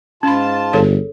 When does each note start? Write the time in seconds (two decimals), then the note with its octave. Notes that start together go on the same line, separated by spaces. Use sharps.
0.23 G#2 C#4 F4 A5 B5
0.73 G1 G#4 A4 C#5